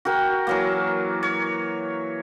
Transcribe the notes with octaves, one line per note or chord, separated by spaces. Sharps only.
F#4 A#4 G5
E3 F#3 A#3
C#5